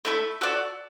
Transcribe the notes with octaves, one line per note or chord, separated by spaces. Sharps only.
A3 E4 A4
F#4 A4 D5